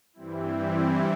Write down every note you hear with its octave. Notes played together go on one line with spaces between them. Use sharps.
G2 E3 G3 C4 E4